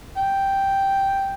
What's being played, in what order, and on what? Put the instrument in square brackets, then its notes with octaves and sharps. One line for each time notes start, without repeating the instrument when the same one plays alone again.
[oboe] G5